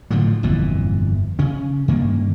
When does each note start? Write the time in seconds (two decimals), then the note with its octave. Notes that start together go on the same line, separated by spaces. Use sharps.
0.11 A2 D3 F3 F#3
0.43 G1 F2 A#2 E3
1.39 C#3 C#4
1.88 G2 D#3 A#3 C#4